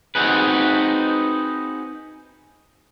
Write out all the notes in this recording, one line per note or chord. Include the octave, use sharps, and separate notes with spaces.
C4 D#4 F#4 G#4 B4